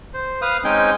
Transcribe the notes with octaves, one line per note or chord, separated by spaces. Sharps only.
C5
B4 F5 D#6
G#3 C4 C#4 D#4 G5 G#5